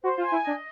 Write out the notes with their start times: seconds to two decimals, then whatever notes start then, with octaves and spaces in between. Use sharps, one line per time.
0.02 F#4 C5
0.18 F4
0.22 G#5
0.32 E4
0.43 D4 D#5